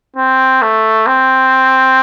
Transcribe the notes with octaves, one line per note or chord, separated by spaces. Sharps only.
C4
A3
C4